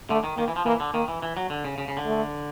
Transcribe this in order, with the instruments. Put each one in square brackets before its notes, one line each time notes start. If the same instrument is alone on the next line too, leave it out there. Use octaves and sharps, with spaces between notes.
[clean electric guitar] D3 [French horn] A3
[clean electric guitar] D#3
[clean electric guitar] D#3 [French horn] A#3
[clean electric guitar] E3
F3
[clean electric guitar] E3 [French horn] A#3
[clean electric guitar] D3
[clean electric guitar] D#3 [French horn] A#3
[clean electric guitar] E3
E3
F#3
D3
C#3
C#3
C#3
D3
[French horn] A3